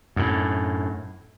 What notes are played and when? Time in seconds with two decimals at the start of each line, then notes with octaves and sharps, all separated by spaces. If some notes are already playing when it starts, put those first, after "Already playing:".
0.16 F#2 A2